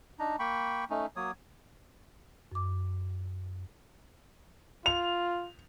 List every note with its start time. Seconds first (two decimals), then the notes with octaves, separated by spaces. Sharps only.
0.19 D4 D#4 A#5
0.39 A#3 G5 B5 C#6
0.90 A3 C#4 D#4
1.16 F#3 A#3 C#5 D#6
2.52 F#2 D6
4.86 F4 F7